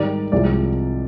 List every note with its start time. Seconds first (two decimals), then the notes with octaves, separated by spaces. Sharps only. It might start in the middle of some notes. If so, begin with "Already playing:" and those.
Already playing: G#2 D#3 G3 D5
0.32 C2 C3 F3 G#3 D5